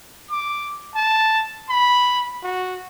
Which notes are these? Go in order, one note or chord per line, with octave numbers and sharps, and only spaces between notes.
D6
A5
B5
F#4